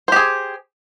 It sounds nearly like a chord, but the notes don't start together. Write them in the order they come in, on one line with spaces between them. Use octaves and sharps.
C5 G4 G#4